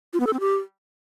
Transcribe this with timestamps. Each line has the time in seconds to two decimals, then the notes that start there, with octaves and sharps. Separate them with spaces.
0.13 F4
0.20 B3
0.27 A4
0.33 C4
0.40 G4